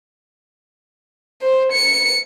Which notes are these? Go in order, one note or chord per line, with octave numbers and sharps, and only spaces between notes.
C5
C#7